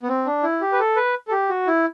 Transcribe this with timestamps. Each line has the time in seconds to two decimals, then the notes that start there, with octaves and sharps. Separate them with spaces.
0.03 B3
0.08 C4
0.26 D4
0.43 E4
0.61 G4
0.72 B4
0.80 A4
0.96 B4
1.28 A4
1.31 G4
1.50 F#4
1.67 E4